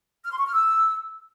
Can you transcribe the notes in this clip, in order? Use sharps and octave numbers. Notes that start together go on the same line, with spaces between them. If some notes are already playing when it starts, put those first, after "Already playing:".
F6
C6
C#6
F6
E6